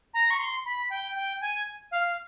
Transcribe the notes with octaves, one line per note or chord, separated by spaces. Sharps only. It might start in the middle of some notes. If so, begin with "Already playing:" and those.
A#5
C#6
C6
B5
G5
G5
G#5
F5